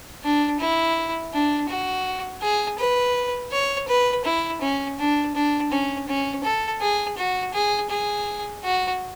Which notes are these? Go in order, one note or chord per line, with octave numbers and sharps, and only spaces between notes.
D4
E4
D4
F#4
G#4
B4
C#5
B4
E4
C#4
D4
D4
C#4
C#4
A4
G#4
F#4
G#4
G#4
F#4